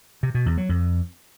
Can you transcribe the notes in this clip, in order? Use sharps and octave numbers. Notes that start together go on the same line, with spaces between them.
C3
B2
E2
F#3
F2